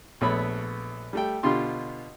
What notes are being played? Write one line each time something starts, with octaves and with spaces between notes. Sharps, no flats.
A#1 A3 B3 C#5 B5
G3 A3 G5
B2 D3 F4 G4 C6